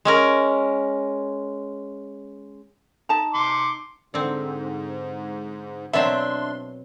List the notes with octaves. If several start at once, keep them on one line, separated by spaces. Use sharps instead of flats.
G#3 C#4 A#4
D#4 A5 A#5
C6 D6
G#2 D3 C4
B2 F#3 C4 D4 E5 C6